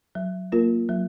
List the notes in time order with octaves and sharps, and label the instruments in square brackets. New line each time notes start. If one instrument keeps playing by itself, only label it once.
[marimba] F#3
A#3 F4 A#4
F#3